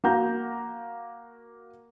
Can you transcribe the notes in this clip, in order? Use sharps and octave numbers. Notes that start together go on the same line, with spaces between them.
A#3 F#4 A#5 G6